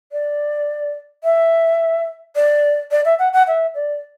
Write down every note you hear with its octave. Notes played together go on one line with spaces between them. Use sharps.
D5
E5
D5
D5
E5
F#5
F#5
E5
D5